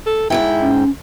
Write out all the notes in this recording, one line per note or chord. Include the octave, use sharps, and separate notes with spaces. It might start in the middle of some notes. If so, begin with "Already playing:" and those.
A4
G#2 D#3 E4 G5
C#4